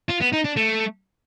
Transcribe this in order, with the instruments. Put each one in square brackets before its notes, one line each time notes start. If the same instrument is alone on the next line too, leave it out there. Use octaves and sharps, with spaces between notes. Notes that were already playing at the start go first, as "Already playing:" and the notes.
[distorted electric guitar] F4
B3
D#4
D4
A3